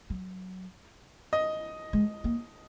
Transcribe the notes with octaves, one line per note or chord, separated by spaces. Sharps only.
F#3
D#5
G#3
A#3